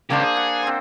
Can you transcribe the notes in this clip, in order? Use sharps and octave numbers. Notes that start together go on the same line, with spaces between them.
C#3 A#3 D4 G4 C5
G#4
F#5
C4 C5